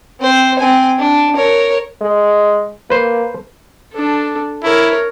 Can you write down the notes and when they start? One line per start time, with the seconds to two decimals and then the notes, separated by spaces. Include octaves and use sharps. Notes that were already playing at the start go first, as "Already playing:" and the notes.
0.20 C4 C5
0.59 C4 G#5
0.99 D4
1.36 A#4 C#5
2.01 G#3
2.90 A#3 B4 C5
3.93 D4 A4
4.64 E4 A#4 C#5